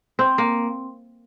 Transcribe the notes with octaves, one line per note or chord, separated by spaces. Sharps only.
C4
A#3